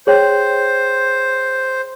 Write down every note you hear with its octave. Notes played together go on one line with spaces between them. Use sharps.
G#4 C5 C#5 G5